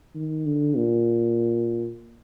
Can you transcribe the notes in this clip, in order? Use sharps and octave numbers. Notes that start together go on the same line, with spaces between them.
D#3
D3
A#2